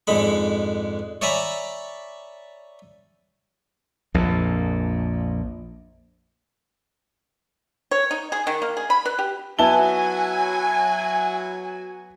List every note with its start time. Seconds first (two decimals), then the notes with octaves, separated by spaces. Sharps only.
0.07 F2 G#2 D3 G#3 B5
1.21 C#5 D5 E5 G#5 A#5 B5
4.14 A#1 F2 A#2
7.91 C#5
8.11 D#4
8.32 G#4
8.47 D#3
8.62 A#3
8.77 G#4
8.90 B5
9.06 B4
9.19 G4
9.59 F#3 B3 E4 F#4 G#5 A5 G7